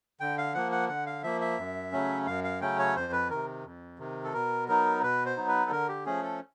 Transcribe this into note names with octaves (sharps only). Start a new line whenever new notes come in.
D3 G5
F5
F3 A#3 F#5
F#5
D3 F#5
F5
F3 A#3 E5
E5
F#2
C#3 F#3 A3 C#4
F#2 F5
F5
C#3 F#3 A3 C#4 G5
C#5
F2 C5
B4
C3 D#3 A#4
F2
C3 D#3
A4
B2 A#4
F#3 B3 D#4 A#4
B2 B4
C5
F#3 B3 D#4
B4
A4
D3 A#4
G4
F3 A3 C#4 G#4
A4